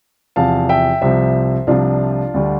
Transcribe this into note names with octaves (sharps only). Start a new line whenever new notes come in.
E2 C3 F3 F5 A5
E5 G5
C2 C3 F3 C5 E5
C2 C3 F3 D4 F4
D2 D3 G3